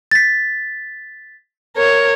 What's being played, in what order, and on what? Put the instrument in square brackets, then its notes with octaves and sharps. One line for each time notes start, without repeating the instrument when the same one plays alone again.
[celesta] A6 B6
[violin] A#4 C#5